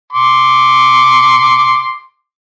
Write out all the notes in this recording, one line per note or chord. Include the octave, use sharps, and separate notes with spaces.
C6 D6